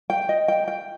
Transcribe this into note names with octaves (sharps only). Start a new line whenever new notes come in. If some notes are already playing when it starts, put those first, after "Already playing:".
G5
D#5
G5
G5